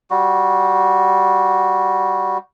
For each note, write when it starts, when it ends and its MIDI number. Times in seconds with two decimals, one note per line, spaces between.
0.11 2.38 55
0.11 2.38 66